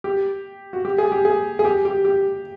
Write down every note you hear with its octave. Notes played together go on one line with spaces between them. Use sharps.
G4
F#4
G4
G#4
G4
G#4
G#4
G4
G4
G4